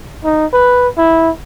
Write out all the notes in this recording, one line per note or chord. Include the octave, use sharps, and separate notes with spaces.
D#4
B4
E4